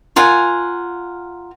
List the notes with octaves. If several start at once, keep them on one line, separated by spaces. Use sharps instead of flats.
F4 A#4 F#5 G#5